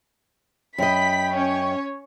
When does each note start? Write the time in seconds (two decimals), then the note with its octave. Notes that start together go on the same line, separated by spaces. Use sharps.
0.78 F#2 D#5 G5 B5 B6
1.36 C#4 C#5